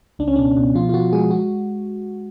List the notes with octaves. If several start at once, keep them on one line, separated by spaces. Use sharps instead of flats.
C#2 D4
C#4
B2 D4
B2
F3 F4
F4
F3 F#4
G#3 G#4
F#4